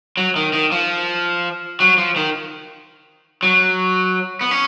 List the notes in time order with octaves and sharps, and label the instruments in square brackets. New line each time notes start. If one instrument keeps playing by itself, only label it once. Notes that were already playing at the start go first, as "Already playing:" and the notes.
[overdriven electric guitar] F#3
D#3
D#3
F3
F#3
F3
D#3
F#3
B3
C#4